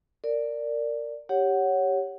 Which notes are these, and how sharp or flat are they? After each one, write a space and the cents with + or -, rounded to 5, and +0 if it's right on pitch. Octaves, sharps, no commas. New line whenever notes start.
A#4 -20 D5 +0
G4 +0 C#5 +0 F#5 +5